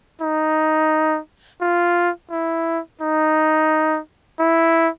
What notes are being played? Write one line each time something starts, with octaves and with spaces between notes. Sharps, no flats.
D#4
F4
E4
D#4
E4